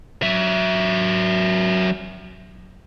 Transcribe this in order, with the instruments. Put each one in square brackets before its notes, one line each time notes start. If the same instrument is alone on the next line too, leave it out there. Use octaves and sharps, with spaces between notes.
[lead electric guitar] F#3 E5